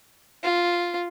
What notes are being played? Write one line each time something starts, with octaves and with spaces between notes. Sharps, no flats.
F4